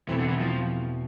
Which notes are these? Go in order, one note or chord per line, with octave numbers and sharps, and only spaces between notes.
E2 B2 E3 A3 C4
D3
E3
F3